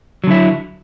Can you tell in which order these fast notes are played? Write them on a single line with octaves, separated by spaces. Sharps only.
F#3 D3 E4